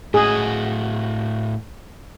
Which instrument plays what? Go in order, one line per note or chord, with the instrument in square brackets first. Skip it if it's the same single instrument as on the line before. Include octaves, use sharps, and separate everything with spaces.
[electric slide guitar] A2 F#4 [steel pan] G#4